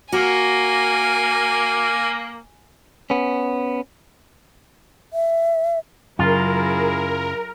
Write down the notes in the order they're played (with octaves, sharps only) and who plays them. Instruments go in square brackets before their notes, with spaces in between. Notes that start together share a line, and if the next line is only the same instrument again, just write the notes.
[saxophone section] A#3 [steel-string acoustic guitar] F#4 [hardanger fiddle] G#5
[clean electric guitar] B3 C#4
[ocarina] E5
[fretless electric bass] F#2 C#3 [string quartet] F#3 E4 G#4 [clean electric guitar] F4 [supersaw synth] A#4